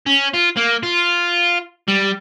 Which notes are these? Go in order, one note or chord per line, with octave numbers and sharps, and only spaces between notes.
C#4
F4
A#3
F4
G3